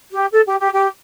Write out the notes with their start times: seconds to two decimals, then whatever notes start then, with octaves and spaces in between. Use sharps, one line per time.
0.12 G4
0.32 A4
0.46 G4
0.59 G4
0.73 G4